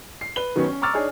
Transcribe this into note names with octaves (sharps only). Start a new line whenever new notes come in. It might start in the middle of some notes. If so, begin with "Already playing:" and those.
C7
B4 G7
D#3 F#3 B3 C#4
C#4
A#5 C#6 D6 E6 F6 A6
D4 D#4 G#4 C#5